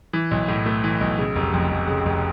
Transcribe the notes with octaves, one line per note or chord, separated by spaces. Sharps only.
E3
B1
A2
A3
E3
B1
C#3
F1
F2
F1
C#3
F1